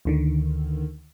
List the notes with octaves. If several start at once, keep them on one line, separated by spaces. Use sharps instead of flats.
D2 D3 D#3